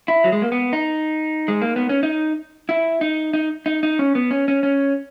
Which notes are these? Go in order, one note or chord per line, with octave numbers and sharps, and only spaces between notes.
E4
F#3
G#3
A#3
B3
D#4
G#3
A#3
B3
C#4
D#4
E4
D#4
D#4
D#4
D#4
C#4
B3
C#4
C#4
C#4